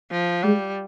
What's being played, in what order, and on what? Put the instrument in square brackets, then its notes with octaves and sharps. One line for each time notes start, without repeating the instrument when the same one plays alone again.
[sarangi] F3
[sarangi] G3 [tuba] G#3